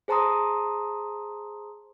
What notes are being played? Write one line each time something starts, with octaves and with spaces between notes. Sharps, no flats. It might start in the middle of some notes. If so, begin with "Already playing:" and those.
G#4 C5 A5 A#5 C6 D#6